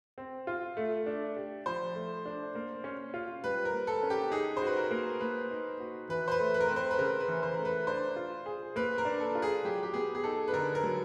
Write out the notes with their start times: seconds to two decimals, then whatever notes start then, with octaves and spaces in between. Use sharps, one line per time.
0.18 C4
0.47 F4
0.77 A3
1.06 D4
1.36 G4
1.66 F3 C5
1.95 A3
2.26 D4
2.55 A#3
2.84 C#4
3.14 F4
3.44 G3 B4
3.65 A#4
3.73 A#3
3.87 A4
4.03 C#4
4.10 G4
4.32 D#4 G#4
4.57 C5
4.62 F#4 B4
4.77 A#4
4.91 A#3
5.20 A#3 B4
5.51 D#4
5.80 F#4
6.09 E3 B4
6.28 C5
6.32 B4
6.39 A3
6.54 B4
6.60 A#4
6.68 C4 B4
6.76 C5
6.91 B4
6.98 C#3 A#4
7.20 B4
7.28 E3
7.43 C5
7.54 A3 A#4
7.65 B4
7.87 D4 C5
8.16 F4
8.46 G#4
8.76 A#3 B4
8.98 A#4
9.05 D4
9.20 A4
9.35 F4
9.42 G#4
9.65 F#3 G4
9.83 G4
9.94 B3 G#4
10.15 G#4
10.24 D#4 A4
10.48 B4
10.53 D3 A#4
10.75 A#4
10.83 F#3